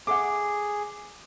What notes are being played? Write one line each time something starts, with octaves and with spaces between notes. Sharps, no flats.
G#4 A4 E5 F#5 D6